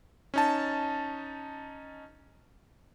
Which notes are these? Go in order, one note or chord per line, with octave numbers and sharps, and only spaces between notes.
C#4 D#4 A5